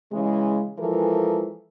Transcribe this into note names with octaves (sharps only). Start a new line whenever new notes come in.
C#3 E3 G#3
E3 F3 G#3 A4 A#4